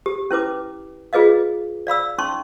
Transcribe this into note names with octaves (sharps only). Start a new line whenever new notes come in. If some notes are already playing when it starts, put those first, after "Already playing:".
G4
C#4 E4 B4 D6
F4 G#4 B4 D#5 F5
D5 F5 B5 E6
C#4 D#4 C6 C#6